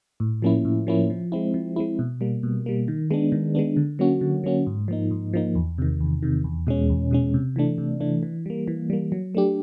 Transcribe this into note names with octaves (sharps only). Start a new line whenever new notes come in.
A2
F3 A#3 C#4 E4
A2
F3 A#3 C#4 E4
F3
G#3 C4 E4
F3
G#3 C4 E4
B2
G3 A#3
B2
G3 A#3
D#3
G#3 B3 D4
D#3
G#3 B3 D4
D3
F#3 A#3 C#4 F#4
D3
F#3 A#3 C#4 F#4
G#2
F3 A#3 D#4
G#2
F3 A#3 D#4
E2
C3 D#3
E2
C3 D#3
E2
B2 G#3 C#4
E2
B2 G#3 C#4
C3
E3 A3 D4
C3
E3 A3 D4
E3
G3 A#3
E3
G3 A#3
F#3
A3 D4 G4